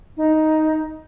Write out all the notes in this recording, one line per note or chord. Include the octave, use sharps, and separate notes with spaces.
D#4